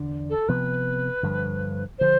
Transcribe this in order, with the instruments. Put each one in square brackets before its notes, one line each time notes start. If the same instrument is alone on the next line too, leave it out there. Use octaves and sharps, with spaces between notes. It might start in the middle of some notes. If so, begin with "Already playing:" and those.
Already playing: [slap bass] E2 D3 D4
[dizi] A4
[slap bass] C3 F3 B3 [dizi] B4
[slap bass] G2 D3 F3
[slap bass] D3 F3 [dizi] C5